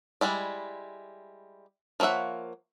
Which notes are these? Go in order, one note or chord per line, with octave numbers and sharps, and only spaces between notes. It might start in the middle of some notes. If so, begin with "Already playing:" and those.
G3 G#3 E4 D5
F3 A#3 C#5 E5 F#5